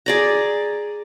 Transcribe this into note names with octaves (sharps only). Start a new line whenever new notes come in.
G#4 D5 A#5